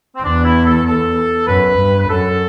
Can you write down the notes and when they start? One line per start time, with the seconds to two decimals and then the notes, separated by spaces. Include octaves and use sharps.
0.15 C4
0.23 E2 D4
0.44 E4
0.65 A4
0.85 A4
1.47 F#2 B4
1.78 G2
1.99 B4
2.09 F#2 A4